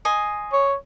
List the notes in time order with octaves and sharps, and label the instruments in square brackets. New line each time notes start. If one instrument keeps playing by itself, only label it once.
[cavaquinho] D#5 G#5 C6
[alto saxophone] C#5